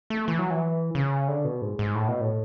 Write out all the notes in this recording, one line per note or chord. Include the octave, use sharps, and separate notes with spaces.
A3
E3
F#3
E3
C#3
D3
B2
G#2
G#2
A2
B2
A2